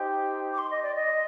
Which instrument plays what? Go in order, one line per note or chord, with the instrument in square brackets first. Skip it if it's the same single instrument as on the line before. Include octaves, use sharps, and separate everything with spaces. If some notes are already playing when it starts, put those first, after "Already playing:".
Already playing: [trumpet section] D#4 G4 C5 G5
[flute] D6
C6
D#5
D5
D#5